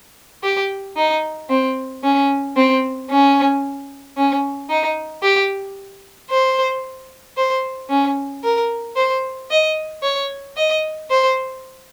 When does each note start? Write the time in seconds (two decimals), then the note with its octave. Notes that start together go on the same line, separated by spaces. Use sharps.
0.43 G4
0.97 D#4
1.50 C4
2.04 C#4
2.56 C4
3.10 C#4
4.17 C#4
4.70 D#4
5.23 G4
6.30 C5
7.37 C5
7.90 C#4
8.44 A#4
8.97 C5
9.50 D#5
10.03 C#5
10.57 D#5
11.10 C5